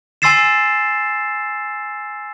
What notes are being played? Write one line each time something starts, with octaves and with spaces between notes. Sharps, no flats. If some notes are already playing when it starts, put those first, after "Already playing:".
G#5 C6 E6 A6 C7 E7